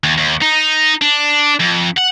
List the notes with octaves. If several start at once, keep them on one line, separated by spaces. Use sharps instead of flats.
D#2
D#2
D#4
D4
F2
F#5